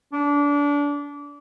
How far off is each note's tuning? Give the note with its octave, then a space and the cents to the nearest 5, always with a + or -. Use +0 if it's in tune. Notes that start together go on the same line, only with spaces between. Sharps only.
D4 -25